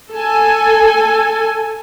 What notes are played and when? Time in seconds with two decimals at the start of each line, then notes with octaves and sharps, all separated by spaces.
0.13 A4 G#5